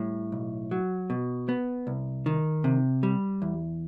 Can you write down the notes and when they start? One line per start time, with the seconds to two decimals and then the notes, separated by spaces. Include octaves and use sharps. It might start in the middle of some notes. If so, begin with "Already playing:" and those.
Already playing: A2 G3
0.32 B1
0.71 F#3
1.10 B2
1.49 B3
1.87 C2
2.26 D#3
2.64 C3
3.03 G3
3.42 E2